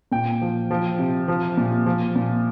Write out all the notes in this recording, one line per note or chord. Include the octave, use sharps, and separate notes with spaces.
A#2 G5
F3
F3
C3
F3
A#2
F3
A#2